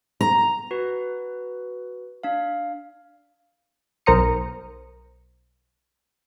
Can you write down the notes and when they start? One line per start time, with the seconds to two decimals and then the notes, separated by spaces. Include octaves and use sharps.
0.21 A#5
0.71 F#4 B4
2.23 D4 F5
4.06 B1 A#4 C5 A#5 D#6 C#7